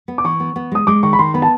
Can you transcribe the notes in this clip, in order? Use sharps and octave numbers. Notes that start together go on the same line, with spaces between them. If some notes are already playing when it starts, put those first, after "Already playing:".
B3
D6
E3 C#6
B3
B3
G#3 D#6
G#3 D6
D#3 C#6
B5
D#3 C6
B3 B5
A5